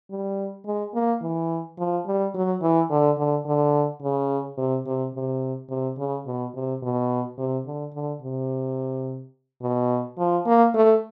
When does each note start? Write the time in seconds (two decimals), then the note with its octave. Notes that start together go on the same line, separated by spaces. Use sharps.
0.10 G3
0.65 G#3
0.94 A#3
1.22 E3
1.78 F3
2.06 G3
2.34 F#3
2.61 E3
2.90 D3
3.18 D3
3.46 D3
4.02 C#3
4.58 C3
4.87 C3
5.15 C3
5.69 C3
5.98 C#3
6.26 B2
6.54 C3
6.82 B2
7.38 C3
7.66 D3
7.94 D3
8.22 C3
9.62 B2
10.18 F3
10.46 A#3
10.75 A3